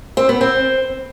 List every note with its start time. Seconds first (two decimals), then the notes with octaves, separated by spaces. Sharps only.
0.17 C4
0.29 B3
0.41 C4